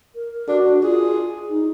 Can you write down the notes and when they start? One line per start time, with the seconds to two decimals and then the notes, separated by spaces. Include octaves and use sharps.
0.15 A#4
0.48 D4 F#4
0.82 F4 G#4
1.50 D#4